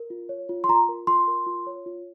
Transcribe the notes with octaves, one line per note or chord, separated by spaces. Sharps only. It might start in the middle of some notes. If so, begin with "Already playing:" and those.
Already playing: A#4
F4
C#5
F4
C6
F4 A#5
A#4
F4 C6
A#4
F4
C#5
F4